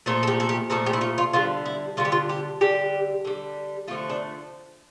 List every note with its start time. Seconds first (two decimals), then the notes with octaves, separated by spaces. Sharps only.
0.06 A#2 F3 A3 A4
0.23 A4
0.27 G4
0.40 A4
0.49 G4
0.70 A#2 F3 A3 A4
0.86 G4
0.93 E4
1.01 F4
1.18 F4
1.33 D3 G3 F4
1.66 E4
1.97 D3 G3 F4
2.05 G4
2.12 F4
2.29 G4
2.61 D3 G3 G4
3.25 D3 G3
3.88 A3 F4
3.91 D3 F3
4.10 D4